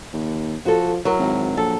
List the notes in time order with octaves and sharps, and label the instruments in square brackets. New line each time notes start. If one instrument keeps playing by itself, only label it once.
[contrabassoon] D#2
[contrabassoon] F3 [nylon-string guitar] F#4 A4
[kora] F#3 [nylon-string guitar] E4 A#4
[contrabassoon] G#1
[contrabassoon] A#1 [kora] A4